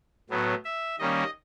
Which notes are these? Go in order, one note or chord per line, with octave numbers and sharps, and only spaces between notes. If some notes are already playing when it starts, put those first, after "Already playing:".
A2 F#3 B3
E5
D#3 G3 A#3 C#4 D#5